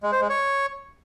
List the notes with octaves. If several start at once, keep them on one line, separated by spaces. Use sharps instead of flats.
G#3
C5
G#3
C#5